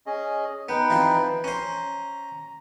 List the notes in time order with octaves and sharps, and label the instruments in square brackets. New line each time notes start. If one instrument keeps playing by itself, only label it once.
[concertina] C#4 G#4 D#5
[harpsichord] B3 [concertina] D#4 B4 G5
[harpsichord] E3 F3 C4
[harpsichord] C#4 C5 [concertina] A#5